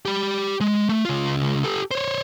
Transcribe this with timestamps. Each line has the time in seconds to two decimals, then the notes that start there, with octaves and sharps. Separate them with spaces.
0.05 G4 B5
0.61 G#3
0.89 A3
1.05 C#2 F4
1.64 G4 A4
1.91 C5 C#5